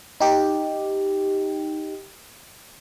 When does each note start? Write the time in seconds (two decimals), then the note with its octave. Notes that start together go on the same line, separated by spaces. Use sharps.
0.21 D#4 G4